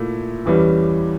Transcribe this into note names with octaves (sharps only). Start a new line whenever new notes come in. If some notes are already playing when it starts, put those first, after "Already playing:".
Already playing: A#2 A3 E4
E2 E3 G3 C#4 G4